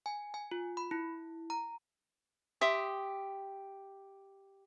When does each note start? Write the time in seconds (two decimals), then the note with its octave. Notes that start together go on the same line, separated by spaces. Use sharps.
0.06 G#5
0.34 G#5
0.51 F4
0.77 B5
0.91 E4
1.50 A#5
2.61 G4 E5 C6 D#6